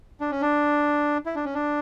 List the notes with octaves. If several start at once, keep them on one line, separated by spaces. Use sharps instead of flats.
D4
C#4
D4
E4
D4
C#4
D4